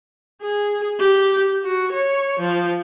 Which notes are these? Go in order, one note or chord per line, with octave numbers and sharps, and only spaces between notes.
G#4
G4
F#4
C#5
F3